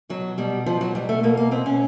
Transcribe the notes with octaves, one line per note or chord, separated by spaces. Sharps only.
B2 F#3
B2 G3
B2 F3
F#3
B2 G3
A3
B2 A#3
A#3
B2 C4
C#4